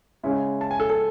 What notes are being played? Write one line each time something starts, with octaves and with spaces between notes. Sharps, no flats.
C#3 G#3 C#4 E4
A5
G#5
A4
A4